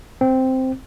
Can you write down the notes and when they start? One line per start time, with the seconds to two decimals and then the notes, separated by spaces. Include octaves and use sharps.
0.21 C4